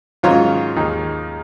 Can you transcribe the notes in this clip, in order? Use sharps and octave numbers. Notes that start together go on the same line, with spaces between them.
G#2 D#3 F#3 C#4 F4
D#2 D#3 G#3 D#4